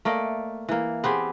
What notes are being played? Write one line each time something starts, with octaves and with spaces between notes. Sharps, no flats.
A3 A#3 D5 D#5
E3 A#3
B3 C4 G4 G#4